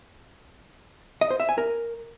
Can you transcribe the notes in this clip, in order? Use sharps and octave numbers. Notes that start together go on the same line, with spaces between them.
D#5
C5
E5
G#5
A#4